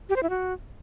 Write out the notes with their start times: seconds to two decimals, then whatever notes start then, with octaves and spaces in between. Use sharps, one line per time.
0.09 G4
0.16 C5
0.23 E4
0.30 F#4